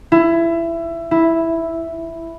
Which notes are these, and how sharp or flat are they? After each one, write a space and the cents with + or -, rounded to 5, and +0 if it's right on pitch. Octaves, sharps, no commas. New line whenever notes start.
E4 +20
E4 +0